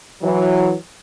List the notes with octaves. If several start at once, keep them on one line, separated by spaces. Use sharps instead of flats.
E3 F#3